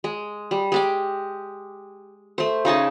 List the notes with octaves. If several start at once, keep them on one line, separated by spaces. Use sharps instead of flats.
G#3
G3
G#3 G4 D6
A3 C5
C#3 D#4 G#4 A5